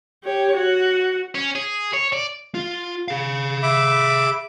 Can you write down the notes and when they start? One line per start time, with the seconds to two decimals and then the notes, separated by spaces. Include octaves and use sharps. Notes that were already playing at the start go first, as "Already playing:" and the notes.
0.24 G4 C#5
0.57 F#4
1.35 C#4
1.55 G#4
1.93 C#5
2.13 D5
2.54 F4
3.08 G#4 F5
3.63 E5 B5 D6